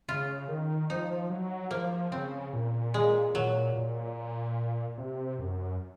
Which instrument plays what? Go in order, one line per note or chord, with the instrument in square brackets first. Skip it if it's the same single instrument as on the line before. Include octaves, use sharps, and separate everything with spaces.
[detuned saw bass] C#3 [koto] F4
[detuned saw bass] D#3
[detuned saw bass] F3 [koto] D#4
[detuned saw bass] F#3
[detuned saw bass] F3 [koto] A#3
[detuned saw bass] C#3 [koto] C4
[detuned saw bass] A#2
[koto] G#3
[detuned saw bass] A#2 [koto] F#3
[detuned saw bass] A#2
C3
F#2